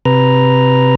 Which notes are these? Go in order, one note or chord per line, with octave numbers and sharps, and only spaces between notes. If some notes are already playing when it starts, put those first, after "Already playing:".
C3 B4 A#5